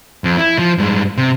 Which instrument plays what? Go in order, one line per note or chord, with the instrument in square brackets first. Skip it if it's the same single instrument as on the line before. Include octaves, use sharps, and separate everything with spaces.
[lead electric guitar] F2
E4
F3
G2 G#3
C3